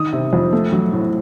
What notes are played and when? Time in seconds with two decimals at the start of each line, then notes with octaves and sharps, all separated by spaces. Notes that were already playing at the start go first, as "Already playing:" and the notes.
Already playing: D#3 D#6
0.13 C3
0.33 F2
0.53 A3
0.72 F#3
0.93 A2